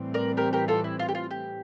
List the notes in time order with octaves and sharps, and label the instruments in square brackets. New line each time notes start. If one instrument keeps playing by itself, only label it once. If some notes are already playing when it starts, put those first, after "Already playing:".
Already playing: [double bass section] A2 E3 G3 C4
[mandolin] A#4 D5
G4 A#4
G4 A#4
F4 A4
E4
F4
G4
F4
G4